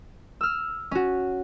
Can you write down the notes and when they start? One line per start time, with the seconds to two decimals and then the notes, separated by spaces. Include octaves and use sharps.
0.41 E6 F6
0.91 C#4 F#4